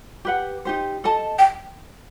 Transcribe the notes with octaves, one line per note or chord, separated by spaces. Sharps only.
G4 B4 F#5
D#4 G4 C5
A4 D#5 A5
G5